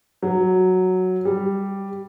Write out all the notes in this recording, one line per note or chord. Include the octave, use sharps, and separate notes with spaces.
F#3
G3